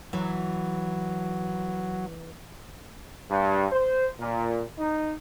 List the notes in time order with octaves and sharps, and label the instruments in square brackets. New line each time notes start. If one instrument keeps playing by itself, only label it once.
[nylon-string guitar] E3 [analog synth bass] F#3
[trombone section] G2
C5
A#2
D#4